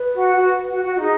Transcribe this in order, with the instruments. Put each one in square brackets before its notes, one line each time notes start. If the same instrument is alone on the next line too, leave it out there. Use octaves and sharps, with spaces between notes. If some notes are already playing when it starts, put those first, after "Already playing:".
Already playing: [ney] B4
[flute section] F#4
F#4
F#4
F#4
F#4
[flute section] D#4 [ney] G#4